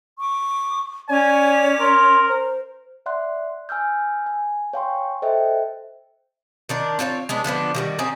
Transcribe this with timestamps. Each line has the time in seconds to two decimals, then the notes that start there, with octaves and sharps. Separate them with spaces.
0.19 C#6 D6
1.09 C#4 C#5 D5 G#5 D6
1.80 A#4 C6
2.28 C5
3.06 D5 E5 F#5 C6 F#6
3.69 G#5 E6 F6 G6
4.26 G#5
4.73 C#5 F5 G5 G#5 C6 C#6
5.22 A4 C5 D#5 E5 G5
6.69 D#3 D4 A#4
6.99 C4 F4 B4 C#5
7.29 G#3 B3 D4
7.44 D3 F3 B3 D4
7.75 D#3 G3 F#4
7.99 C4 C#4 G#4 A#4